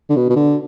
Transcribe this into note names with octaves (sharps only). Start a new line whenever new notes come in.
D3
B2
B2
D3